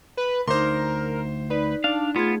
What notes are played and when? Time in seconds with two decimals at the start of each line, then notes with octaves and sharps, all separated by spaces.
0.17 B4
0.48 D2 D#4 A#4 C5 C6 D6
1.50 D#4 B4 D5
1.84 D4 D#4 F5
2.16 A3 B3 F4 G#4 G#6